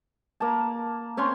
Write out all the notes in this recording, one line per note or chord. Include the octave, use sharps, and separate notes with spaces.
A#3 A5
C4 C#4 C#5 C6